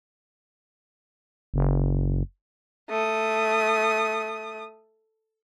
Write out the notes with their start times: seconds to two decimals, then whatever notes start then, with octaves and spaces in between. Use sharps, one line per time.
1.54 F#1
2.90 A3 D#6